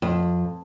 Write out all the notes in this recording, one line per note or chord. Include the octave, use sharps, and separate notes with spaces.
F2